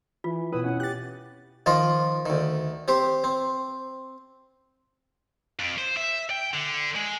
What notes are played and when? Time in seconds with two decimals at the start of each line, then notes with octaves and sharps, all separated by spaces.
0.24 E3 F4
0.53 B2 E4 B4 D#6
0.64 C#4 F#5
0.80 G4 F#6 A6
1.66 D#3 F3 F4 D#5
2.26 D2 D#3
2.88 C4 G4 C5
3.24 C4
5.59 F2
5.78 C5
5.97 E5
6.31 G5
6.54 D3
6.95 G#3